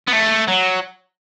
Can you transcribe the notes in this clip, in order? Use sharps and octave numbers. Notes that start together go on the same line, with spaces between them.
B3
A3
F#3